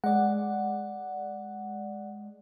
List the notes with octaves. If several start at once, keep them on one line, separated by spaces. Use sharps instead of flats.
G#3 D5 F#5